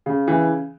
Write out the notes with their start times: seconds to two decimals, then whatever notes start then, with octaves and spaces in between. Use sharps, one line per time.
0.06 C#3
0.28 E3